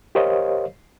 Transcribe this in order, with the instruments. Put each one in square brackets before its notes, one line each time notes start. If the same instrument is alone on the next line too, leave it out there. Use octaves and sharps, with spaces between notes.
[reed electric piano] G4 A#4 C5 C#5 D#5 F5